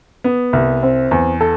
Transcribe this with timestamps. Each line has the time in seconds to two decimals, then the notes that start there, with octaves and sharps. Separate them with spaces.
0.24 B3
0.53 C2
0.83 C4
1.11 E2
1.41 A4